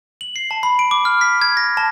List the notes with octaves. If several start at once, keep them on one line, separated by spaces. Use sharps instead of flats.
F#7
C7
A5
B5
D7
D6
F6
B6
G#6
A#6
A5